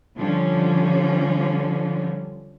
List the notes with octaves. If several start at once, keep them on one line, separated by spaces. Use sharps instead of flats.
D3 F3 G3 C#4